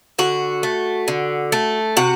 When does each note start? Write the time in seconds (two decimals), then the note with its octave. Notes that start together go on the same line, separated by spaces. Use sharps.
0.19 D3 F#4
0.63 A3
1.08 D3
1.52 A3
1.97 C3 F#4